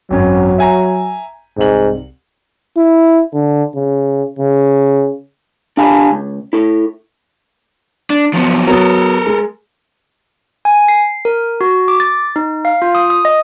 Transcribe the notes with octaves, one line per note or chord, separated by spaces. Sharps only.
G#1 F#2 F#3
E5 G#5 A#5
C2 G#2 F#7
E4
D3
C#3
C#3
D4 G4 F5 G#5 A5 B5
C#2
E4 A4
D4
F3 F#3 B3
F#3 B3 A4 A#4
G#3
G#5
C7
A#4
F#4
D6
A6
D#4
F5
F4
D#6
D#6
D#5